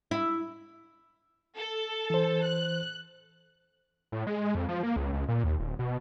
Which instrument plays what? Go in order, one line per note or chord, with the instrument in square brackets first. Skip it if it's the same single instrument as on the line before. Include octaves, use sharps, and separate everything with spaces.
[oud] E4
[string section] A4
[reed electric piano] E3 C5
[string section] F#6
[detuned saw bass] A2
G#3
F2
F3
A#3
C#2
C#2
A#2
D#2
D1
B2